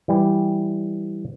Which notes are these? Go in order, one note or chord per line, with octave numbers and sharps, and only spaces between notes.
E3 G3